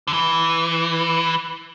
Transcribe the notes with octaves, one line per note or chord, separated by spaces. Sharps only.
D3
E3